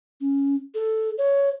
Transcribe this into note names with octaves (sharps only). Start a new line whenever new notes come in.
C#4
A4
C#5